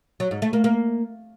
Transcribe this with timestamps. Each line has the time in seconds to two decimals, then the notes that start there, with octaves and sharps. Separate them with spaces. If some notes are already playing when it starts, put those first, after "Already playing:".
0.20 F#3
0.31 G#2
0.42 A3
0.53 A#3
0.64 A#3